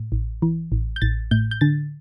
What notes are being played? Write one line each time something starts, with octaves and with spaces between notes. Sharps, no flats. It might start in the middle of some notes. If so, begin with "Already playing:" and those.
Already playing: A2
A1
E3
A1
G6
A1 A6
A2 G6
G6
D3 A6